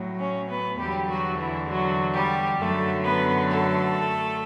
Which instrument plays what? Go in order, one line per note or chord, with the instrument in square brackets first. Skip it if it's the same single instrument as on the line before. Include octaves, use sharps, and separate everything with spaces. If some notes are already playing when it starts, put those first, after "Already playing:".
Already playing: [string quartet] A2 F#3
C#4 C#5
B3 B4
E2 D3 F#3 G3 G4
F#3 F#4
E3 E4
F#3 F#4
G3 G4
F#2 D3 F#3 A3 A4
B3 B4
A3 A4